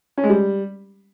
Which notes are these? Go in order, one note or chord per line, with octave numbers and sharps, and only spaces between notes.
C#4
G#3
G3